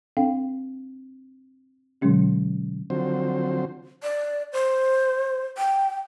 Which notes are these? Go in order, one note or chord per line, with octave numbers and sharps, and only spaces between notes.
C4 D4 A4 F5 G5
B2 D3 F#3 G#3 C#4 G4
D3 F3 F#3 C4 C5
D5
C5
G5